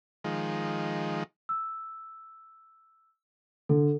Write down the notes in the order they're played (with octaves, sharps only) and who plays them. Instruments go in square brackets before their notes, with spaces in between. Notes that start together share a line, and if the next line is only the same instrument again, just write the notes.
[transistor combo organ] D#3 F3 G#3
[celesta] E6
[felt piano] D3 [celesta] A4